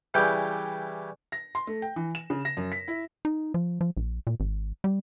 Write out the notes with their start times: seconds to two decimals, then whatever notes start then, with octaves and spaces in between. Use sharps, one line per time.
0.14 C#3 E3 G3 E4 B4 G5
1.32 A#6
1.55 C6
1.67 A3
1.82 G5
1.96 E3
2.15 E7
2.30 C#3
2.45 A#6
2.57 F#2
2.72 B6
2.88 E4
3.25 D#4
3.54 F3
3.81 F3
3.97 A#1
4.27 A#2
4.40 G#1
4.84 G3